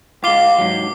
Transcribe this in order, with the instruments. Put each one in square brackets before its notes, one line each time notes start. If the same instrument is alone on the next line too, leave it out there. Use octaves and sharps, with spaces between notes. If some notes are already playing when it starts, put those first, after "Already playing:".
[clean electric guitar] G#3 F4 [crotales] D6 C7 G7
[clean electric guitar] G#2 F#3